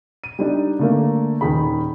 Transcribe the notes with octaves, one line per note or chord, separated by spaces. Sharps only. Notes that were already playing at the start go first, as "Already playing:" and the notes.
D#7
G3 D4 D#4
D3 A3 A#3
D#1 D#3 G#4 B5